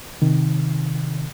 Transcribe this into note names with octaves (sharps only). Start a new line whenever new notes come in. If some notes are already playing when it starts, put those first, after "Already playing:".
C3 D#3